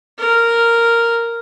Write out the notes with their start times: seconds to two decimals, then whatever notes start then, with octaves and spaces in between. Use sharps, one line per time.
0.19 A#4